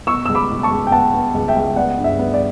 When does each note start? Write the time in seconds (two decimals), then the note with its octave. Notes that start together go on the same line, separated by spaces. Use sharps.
0.07 B2 C#6 E6
0.26 C#2 E6
0.35 B5 D6
0.49 B2
0.63 A5 C#6
0.71 C#2
0.87 G5
0.91 B3 F#5 A5
1.14 B3
1.34 C#2
1.48 E5 G5
1.56 C#2
1.76 B3 D5 F#5
1.98 G2
2.04 E5
2.19 B3
2.34 D5